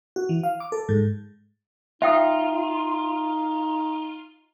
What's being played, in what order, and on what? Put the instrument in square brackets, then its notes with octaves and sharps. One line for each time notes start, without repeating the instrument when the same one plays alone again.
[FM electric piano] F#4
E3
F5
D6
A4
G#2
[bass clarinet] D#4 [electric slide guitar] F4 [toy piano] E5 G5 D#6